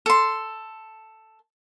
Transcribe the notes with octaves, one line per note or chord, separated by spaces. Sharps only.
A4 C6